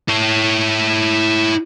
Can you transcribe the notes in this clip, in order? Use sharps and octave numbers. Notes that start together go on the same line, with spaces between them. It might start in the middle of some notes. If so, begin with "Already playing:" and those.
E4 C#5